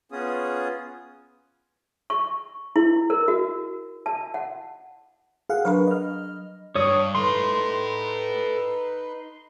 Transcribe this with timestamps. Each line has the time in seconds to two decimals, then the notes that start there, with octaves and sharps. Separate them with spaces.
0.12 B3 C#4 F4 G#4 D#6
2.10 C#6
2.76 E4
3.10 A#4
3.28 F#4
4.06 A5
4.34 F#5
5.49 G#4 F5 F#5
5.65 F#3 D4 A#4 B4 B5
5.87 D#5 F6
6.75 G2 C#5 D#6
7.15 D#4 A4 B4 B5 C6